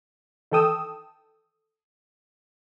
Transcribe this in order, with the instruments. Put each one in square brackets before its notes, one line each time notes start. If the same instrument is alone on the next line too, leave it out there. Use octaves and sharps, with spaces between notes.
[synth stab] D#3 E3 A4 G5 D#6 E6